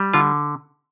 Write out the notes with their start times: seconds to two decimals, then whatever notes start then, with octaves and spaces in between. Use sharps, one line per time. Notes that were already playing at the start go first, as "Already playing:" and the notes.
Already playing: G3
0.14 D3 F4